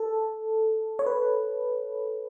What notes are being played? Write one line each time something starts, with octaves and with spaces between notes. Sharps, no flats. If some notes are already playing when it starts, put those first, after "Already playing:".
Already playing: A4
C#5
B4